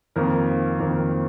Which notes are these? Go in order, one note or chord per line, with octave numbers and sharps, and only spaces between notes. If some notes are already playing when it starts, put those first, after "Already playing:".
F2 D#3 A#3 A#4
F2 D#3 A#3